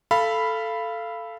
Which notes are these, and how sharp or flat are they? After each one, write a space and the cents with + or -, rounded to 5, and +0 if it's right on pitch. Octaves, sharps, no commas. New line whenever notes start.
A4 +0 F5 -20 B5 +0